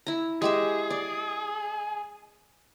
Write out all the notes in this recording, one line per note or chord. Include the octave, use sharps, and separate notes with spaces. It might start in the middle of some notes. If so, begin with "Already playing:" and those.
E4 A#5
G#3 G4 G#4 E5
D5